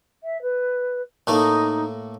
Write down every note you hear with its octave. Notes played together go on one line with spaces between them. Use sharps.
E5
B4
A2 A3 A#3 D#4